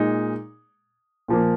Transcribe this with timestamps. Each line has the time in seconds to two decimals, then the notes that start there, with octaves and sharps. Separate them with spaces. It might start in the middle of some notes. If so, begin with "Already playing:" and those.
Already playing: A#2 G#3 D#4
1.28 A#2 F3 A#3